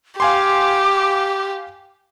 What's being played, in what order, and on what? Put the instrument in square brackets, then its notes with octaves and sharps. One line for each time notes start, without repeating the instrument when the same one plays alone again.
[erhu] G4 [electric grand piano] F5 G#5 C6 [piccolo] D6